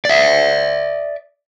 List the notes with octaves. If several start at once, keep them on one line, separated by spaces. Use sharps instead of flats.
D5 E5